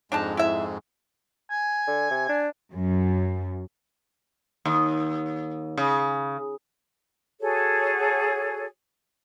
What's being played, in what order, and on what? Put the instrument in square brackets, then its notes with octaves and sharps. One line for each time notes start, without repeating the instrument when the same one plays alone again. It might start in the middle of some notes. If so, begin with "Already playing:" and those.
[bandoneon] F2 G#2 G#3 [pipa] D4 D#4 A5
[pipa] E4 E5
[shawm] G#5
[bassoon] D3
C3
D4
[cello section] F#2
[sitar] D#2
C#3
[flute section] F#4 G#4 A4 C#5